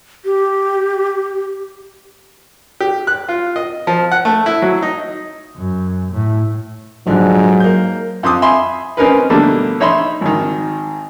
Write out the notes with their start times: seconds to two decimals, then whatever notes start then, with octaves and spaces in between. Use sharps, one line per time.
0.25 G4
2.80 G4
3.07 F#6
3.28 F4
3.56 D#5
3.87 F3
4.12 F#5
4.25 A3
4.46 E4
4.62 F#3
4.82 D#4
5.58 F#2
6.12 A2
7.07 A#1 G#2 D3 F#3
7.60 A#3 G6
8.23 F2 C6 D6 D#6
8.42 E5 G#5 B5 C6
8.97 C4 C#4 D#4 A#4 B4
9.30 B2 D3 G3 A3 A#3
9.80 D#4 C#5 E5 B5 C6
10.21 G#1 D#3